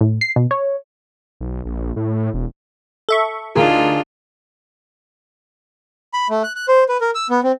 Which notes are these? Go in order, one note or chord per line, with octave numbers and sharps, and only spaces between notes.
A2
C7
B2
C#5
B1
A#1
A2
E1
A4 E5 C#6
D2 D4 D#4 F4 G#4 A#4
B5
A3
F#6
F#6
C5
B4
A#4
E6
B3
C4